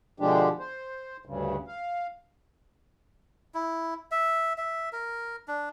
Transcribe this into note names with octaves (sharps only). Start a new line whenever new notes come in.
B2 D3 F3 G#3 D4 G4
C5
D2 G2 C#3
F5
E4
E5
E5
A#4
D4